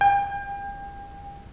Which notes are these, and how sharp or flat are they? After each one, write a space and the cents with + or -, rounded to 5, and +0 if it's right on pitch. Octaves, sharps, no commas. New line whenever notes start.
G5 +35